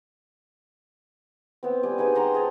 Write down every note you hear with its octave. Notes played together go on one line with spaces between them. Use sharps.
B3 C4
G3 G#5
D#4 G4 G#4 B4
F#5 A#5 C6 E6
G#4 C5 A5